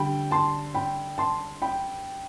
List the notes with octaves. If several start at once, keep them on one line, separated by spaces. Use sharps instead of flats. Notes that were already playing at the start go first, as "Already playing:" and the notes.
Already playing: D3 G3 G5 B5
A5 C6
G5 B5
A5 C6
G5 B5